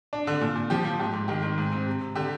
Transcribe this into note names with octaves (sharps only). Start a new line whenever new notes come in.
D4
D3
A#2
A#2
F3 G4
F3
G#2 G4
G#2
D#3 G4
D#3
G#2
C4
C3
C3
D3 G4